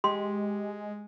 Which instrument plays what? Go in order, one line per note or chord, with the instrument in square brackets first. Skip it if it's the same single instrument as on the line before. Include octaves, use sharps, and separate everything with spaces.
[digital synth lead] G#3 [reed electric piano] G4 [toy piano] C6